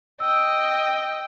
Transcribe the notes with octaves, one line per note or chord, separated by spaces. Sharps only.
D#5 G5 E6